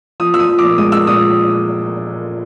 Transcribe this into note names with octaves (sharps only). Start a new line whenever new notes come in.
F3 D#6
F3 E6
D#6
F3
A#2 D6
G#3 D#6
G#3 E6
A#2 D#6